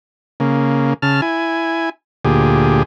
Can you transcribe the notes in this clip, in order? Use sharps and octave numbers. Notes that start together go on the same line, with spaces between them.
C#3 A#3
C#3 A5 F6
E4 G#5
D2 A#2 G4 G#4